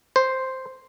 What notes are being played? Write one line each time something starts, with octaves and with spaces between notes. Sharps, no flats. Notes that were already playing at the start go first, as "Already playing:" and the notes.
C5